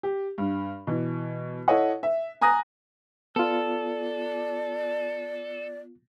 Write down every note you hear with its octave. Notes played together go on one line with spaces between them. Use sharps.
G4
G2
B2 E3
E4 A4 C#5 D#5 F#5
E5
G#5 A#5 D#6 F#6 A#6
B3 F4 A4 D5